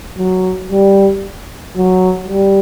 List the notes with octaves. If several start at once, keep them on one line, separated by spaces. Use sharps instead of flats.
F#3
G3
F#3
G3